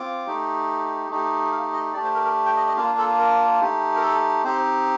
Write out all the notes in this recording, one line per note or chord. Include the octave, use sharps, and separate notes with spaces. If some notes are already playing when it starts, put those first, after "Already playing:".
Already playing: C4 F4 D6
A3 D#4 G4
A3 D#4 G4
F5
D#5
A3 D4 G4 D5
C5
A#4
A#4
G5
D#5
D#5
A#3 D4 F4 F5
A4
A#4
A3 D#4 G4
A#4
A4
C4 D#4 G4 C5